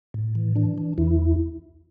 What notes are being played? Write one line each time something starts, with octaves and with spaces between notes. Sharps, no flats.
A2
E3
E3 D4
E3
E2 E3 E4